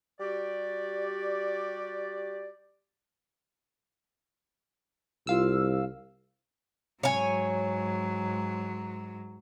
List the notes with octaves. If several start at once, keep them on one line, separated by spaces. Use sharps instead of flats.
G3 F#4 G4 D5
C2 F4 F5 E6
G#2 F#3 C#5 G#5